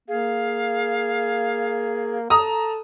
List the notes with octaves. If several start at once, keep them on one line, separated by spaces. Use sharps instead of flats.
A#3 G#4 F5
A4 A#5 D#6